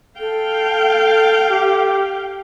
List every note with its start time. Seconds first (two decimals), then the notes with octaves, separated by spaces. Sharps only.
0.20 A4 F5 G5
1.50 G4